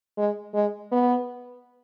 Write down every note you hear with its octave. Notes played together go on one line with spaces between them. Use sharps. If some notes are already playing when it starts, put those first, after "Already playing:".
G#3
G#3
B3